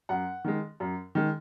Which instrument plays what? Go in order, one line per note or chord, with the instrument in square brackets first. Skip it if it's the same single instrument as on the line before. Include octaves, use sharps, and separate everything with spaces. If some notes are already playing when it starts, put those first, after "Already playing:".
[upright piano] F#2 F#5
D#3 G#3
F#2
D#3 G#3